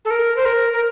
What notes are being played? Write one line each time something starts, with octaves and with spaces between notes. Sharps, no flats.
A4
A#4
C5
A#4
A#4